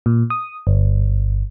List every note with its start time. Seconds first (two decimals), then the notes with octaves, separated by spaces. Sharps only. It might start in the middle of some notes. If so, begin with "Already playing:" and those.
0.06 A#2
0.30 D#6
0.67 G1